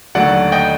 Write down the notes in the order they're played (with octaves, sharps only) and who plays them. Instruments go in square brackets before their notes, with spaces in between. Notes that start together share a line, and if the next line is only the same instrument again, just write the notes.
[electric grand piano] D#2 D3 F#3 A3 D5 F#5
D#5 G5